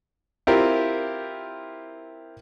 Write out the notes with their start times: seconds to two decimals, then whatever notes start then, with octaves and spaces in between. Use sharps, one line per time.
0.47 C4 E4 F4 G4 A#4